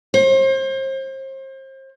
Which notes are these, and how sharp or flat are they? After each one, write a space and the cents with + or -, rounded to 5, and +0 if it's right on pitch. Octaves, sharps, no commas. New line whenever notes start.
C5 +35